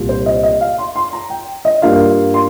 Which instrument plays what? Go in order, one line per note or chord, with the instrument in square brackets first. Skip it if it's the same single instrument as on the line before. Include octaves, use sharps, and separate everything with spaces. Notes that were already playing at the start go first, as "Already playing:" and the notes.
Already playing: [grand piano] C2 A#2 A#3 F4
C5
D#5
D#5
F5
C6
C6
A#5
G5
D#5
G2 G3 A#3 F4 F5
C6